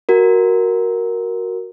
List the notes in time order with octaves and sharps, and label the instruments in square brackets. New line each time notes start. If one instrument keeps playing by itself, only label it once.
[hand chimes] F#4 A#4